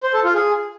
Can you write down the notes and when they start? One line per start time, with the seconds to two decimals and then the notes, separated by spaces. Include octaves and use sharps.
0.03 C5
0.14 A4
0.24 F4
0.35 G#4